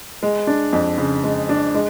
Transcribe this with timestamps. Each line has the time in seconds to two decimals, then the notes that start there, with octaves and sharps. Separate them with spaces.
0.23 G#3
0.47 D4
0.73 F2
0.98 C#3
1.24 G#3
1.49 D4
1.74 G#3